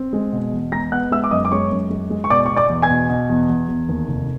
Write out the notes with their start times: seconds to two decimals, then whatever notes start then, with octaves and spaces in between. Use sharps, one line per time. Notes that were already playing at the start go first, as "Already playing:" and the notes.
Already playing: C4
0.13 G#3
0.33 B2
0.53 E2
0.72 G#3 A#5 A#6
0.92 B3 F#5 F#6
1.11 G#3 E5 E6
1.24 D6
1.31 F#2 D#5 D#6
1.45 D6
1.51 G#3 C#5 C#6
1.72 F#2
1.90 G#3
2.10 G#3
2.24 C#6
2.30 B2 D5 D6
2.46 B2 C#6
2.57 D5 D6
2.70 E2
2.82 G#5 G#6
2.90 B2
3.09 B2
3.29 E2
3.49 E2
3.69 E2
3.89 D#2
4.08 F1